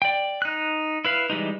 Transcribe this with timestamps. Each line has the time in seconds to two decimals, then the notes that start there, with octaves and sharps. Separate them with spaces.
0.02 D5 G5
0.42 D#4 F#6
1.05 E4 B4 F5
1.30 E3 G3 G#3 D#4